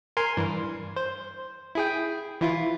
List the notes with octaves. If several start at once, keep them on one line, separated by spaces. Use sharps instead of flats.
A#4 G#5 C6
G2 E3
C5
E4 G#4 G5
E3 E4 F4